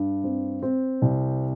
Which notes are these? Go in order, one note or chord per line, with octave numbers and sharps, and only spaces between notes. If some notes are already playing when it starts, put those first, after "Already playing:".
Already playing: G2
C4
C4
C2